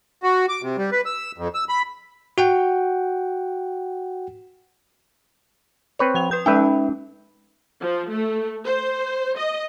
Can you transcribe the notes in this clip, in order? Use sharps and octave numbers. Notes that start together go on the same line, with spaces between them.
F#4
D6
C3
G3
B4
E6
F2
E6
B5
F#4 F#5 G5
C4 B4 C#5
F3 G5 F7
B4 D#6 G6
G#3 C#4 D#4 B4 E5 G5
F3
A3
C5
D#5